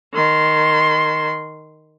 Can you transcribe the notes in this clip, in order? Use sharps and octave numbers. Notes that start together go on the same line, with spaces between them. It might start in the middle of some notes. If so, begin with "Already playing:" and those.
D#3 C6